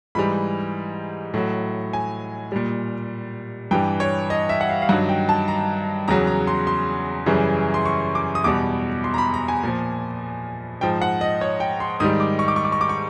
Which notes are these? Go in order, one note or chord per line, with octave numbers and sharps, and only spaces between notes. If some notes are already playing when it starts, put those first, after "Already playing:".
G#2 E3 G3 B5
A2 F#3
G#5
A#2 G3
G2 E3 G3 G5
C#5
D#5
E5
F#5
F5
F5
G2 D#3 F#3 F#5
G5
A5
A#5
E2 C#3 F#3 A#5
A#5
C6
C6
F#2 C#3 E3 G3
C6
C#6
D6
D#6
E2 B2 G3 D6
C6
A#5
B5
A#5
G#5
A#2 F3
G#2 F3 G5
F#5
D#5
C#5
G5
C6
G#2 D#3 G3 D#6
D6
C#6
D6
C#6
D6
C#6
D6
C#6